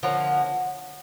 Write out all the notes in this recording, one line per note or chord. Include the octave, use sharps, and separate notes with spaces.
D3 F3 A#3 C#4